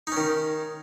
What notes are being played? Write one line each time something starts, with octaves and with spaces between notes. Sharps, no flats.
D#3 C#4 D#4